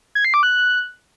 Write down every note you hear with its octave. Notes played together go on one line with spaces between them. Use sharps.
G#6
C7
D6
F#6